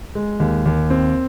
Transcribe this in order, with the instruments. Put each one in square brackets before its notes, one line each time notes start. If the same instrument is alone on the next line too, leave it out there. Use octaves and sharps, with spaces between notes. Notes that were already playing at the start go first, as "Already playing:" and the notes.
[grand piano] G#3
D#2
D#2
C4